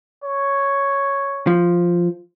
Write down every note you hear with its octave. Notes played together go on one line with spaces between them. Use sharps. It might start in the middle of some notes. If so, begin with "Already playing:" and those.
C#5
F3